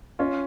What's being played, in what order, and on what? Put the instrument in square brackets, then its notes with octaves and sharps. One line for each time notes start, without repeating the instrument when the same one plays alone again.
[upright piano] C#4 [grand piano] F4